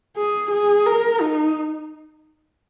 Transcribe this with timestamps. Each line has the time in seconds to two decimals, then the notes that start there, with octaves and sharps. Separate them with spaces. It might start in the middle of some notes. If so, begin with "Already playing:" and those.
0.17 G#4
0.51 G#4
0.86 A#4
1.20 D#4